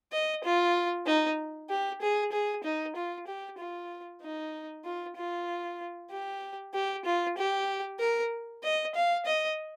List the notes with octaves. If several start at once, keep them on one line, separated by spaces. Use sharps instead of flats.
D#5
F4
D#4
G4
G#4
G#4
D#4
F4
G4
F4
D#4
F4
F4
G4
G4
F4
G4
A#4
D#5
F5
D#5